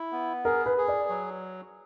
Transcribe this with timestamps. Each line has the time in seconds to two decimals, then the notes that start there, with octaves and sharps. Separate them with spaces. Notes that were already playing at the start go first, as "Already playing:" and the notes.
Already playing: E4
0.12 B3
0.45 G#4 A#4
0.66 B4
0.78 G#4
0.88 D5
1.09 F#3